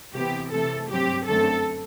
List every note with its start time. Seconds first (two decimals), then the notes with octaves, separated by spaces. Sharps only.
0.15 C3 E3 B3 G4
0.52 C3 E3 A3 A4
0.89 G2 F#3 C4 G4
1.27 F#2 D3 A3 C4 A4